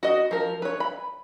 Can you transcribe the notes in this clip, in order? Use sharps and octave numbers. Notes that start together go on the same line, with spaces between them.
F#4 D#5
F3 A#4
B4 C#5
B5